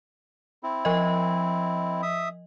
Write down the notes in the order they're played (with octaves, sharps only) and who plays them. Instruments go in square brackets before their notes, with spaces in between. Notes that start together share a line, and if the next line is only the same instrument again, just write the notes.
[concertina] C4 E4
[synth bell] F3 D#5
[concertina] E5 D#6